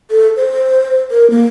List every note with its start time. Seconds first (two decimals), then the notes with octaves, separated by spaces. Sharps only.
0.11 A4
0.36 C5
1.11 A#4
1.30 A#3